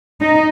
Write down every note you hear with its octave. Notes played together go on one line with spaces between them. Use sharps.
D#4